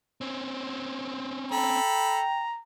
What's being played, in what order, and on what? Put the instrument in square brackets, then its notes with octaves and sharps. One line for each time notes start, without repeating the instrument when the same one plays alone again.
[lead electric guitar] C4 C#4
[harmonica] A4 B5 [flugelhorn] G5 [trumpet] A#5